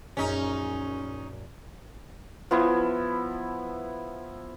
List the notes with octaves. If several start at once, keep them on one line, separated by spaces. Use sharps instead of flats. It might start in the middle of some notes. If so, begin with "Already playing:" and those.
A#1 F#2 C#4 D#4
F3 B3 E4